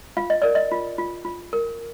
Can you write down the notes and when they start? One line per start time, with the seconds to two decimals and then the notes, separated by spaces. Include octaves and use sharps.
0.17 F4 F5
0.30 D#5
0.42 A#4 D5
0.55 D#5
0.71 F4
0.98 F4
1.25 F4
1.53 A#4